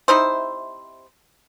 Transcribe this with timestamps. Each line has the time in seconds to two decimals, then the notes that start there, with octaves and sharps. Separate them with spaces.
0.08 C3 D#4 E4 C5